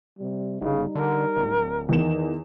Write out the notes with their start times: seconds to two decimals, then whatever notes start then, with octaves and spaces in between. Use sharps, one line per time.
0.19 C3 G3
0.61 G1 C#3 G3 D#4
0.95 D3 A#4
1.37 D1
1.89 E2 D#3 E7